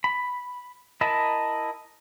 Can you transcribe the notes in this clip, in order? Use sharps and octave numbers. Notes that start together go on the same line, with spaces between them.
B5
E4 A#4 D#5 A5 B5